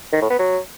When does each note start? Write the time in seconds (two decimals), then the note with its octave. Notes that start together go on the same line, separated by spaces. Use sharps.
0.13 D#3
0.21 A2
0.30 B3
0.39 F#3